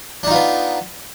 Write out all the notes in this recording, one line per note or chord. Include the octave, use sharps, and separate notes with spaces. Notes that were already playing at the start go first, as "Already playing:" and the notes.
B3 D4 D#4 F4